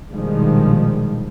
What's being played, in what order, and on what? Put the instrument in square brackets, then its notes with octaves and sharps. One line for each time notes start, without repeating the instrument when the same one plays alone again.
[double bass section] A#1 B2 D#3 F3 G3 G#3